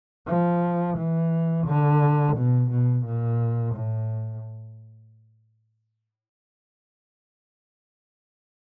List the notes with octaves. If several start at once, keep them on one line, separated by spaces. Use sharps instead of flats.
F3
E3
D3
B2
B2
A#2
A2